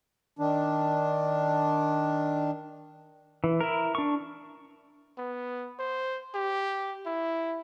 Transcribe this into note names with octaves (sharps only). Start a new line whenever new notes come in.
D#3 D4
E3
E4 A#4
D4 C#6
B3
C5
G4
E4